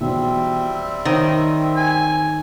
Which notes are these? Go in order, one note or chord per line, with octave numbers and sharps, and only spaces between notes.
B1 E2 B2 G3 C4 E5
D#3 A#4 C5 C#5
G#5